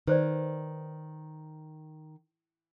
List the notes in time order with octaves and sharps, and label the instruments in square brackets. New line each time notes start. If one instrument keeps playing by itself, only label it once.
[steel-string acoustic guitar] D#3 [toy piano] B4 C5 D5